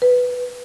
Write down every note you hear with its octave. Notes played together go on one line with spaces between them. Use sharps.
B4